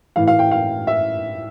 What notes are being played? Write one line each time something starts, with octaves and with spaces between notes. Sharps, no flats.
A2 E3 A3 F5
F5
G5
F5
E5